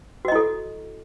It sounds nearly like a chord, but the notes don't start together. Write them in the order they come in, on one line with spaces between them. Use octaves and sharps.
F#4 D#5 E4 A4